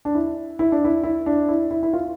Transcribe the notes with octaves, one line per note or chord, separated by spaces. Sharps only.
D4
E4
E4
D4
E4
E4
D4
E4
E4
E4
F4